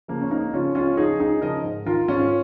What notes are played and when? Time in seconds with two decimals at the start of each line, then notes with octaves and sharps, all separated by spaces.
0.08 C#3 F3 A#3
0.21 C#4
0.30 C#2 A#3 D#4
0.53 C#3 F3 C#4 F4
0.75 C#2 C#4 F4
0.97 C#3 F3 D#4 G#4
1.20 C#2 D#4 G#4
1.41 C#3 F3 A#4 D#5
1.64 G#2
1.86 D#3 F4 A#4
2.08 G#2 C#4 F4